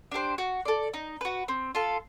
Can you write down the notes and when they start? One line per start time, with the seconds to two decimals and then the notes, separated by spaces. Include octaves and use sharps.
0.12 D4 G4 C5
0.38 F#4
0.65 A4 D5
0.94 D#4
1.21 F#4 B4
1.48 C4
1.75 F4 A4